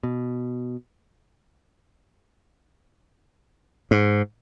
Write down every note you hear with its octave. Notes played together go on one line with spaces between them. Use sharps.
B2
G#2